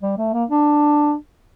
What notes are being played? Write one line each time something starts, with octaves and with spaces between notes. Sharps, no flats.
G3
A3
A#3
D4